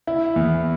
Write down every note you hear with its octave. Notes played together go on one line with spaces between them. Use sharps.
E4
E2